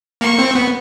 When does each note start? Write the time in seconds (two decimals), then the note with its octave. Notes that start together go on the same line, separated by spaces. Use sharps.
0.21 A#3 C#6
0.39 C4
0.55 B3